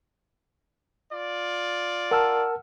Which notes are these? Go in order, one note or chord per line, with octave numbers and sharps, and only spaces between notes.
F4 D5
A#4 F#5 A5 E6 F6